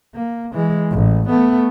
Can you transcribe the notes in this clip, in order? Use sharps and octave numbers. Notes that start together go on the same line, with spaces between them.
A#3
E3 G#3
A1
A3 B3